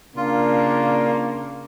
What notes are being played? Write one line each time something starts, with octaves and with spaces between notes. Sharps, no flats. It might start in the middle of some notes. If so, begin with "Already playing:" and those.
C#3 A#3 D4 F4